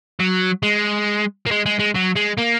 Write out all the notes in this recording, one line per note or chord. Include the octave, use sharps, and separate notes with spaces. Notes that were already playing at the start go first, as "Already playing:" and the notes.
F#3
G#3
A#3
G#3
G#3
G#3
F#3
G#3
A#3